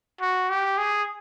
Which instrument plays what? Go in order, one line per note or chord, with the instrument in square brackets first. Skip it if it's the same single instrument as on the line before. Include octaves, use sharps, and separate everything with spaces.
[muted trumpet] F#4
G4
G#4